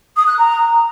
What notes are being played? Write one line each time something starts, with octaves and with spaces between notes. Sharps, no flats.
D#6
F#6
A#5